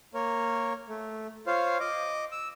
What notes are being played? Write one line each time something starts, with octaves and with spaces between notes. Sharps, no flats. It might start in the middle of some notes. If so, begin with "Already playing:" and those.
A#3 A#4 C#5
A3
F4 C5 C#5 F5
D#5 D6
E6